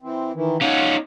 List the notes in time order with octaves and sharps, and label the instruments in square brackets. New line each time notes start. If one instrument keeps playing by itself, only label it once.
[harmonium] E3 C4
D#3 E3
[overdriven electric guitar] C#4 D#4 [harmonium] F5 F#5